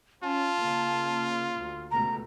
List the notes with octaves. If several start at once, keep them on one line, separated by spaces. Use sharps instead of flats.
C#4 F4 A5
C#3 A#3
D2
C#2 B2 A3 A#5